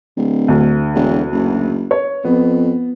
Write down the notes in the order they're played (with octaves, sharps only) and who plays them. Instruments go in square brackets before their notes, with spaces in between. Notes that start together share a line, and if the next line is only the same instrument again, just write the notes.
[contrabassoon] D1
[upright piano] D2
[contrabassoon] E1
F#1
[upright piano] C#5
[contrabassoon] F2 [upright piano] B3